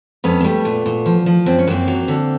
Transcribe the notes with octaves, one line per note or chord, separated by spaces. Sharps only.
F2 B3 C#4
A#3
G3 A3 B3
A#2
A#2
F3
F3
F#2 C4
C#4
F#2 A#3 C4
F#3
D3